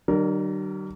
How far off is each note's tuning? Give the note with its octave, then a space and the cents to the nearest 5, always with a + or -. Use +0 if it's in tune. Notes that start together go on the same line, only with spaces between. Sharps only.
D3 +45 G3 -45 A#4 +0